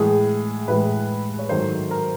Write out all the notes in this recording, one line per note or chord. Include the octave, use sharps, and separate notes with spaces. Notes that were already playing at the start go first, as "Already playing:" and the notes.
Already playing: A2 E3 G#3 G#4
A2 E3 G#3 B4
C#5
G#2 D#3 F#3 A3 C5
A#4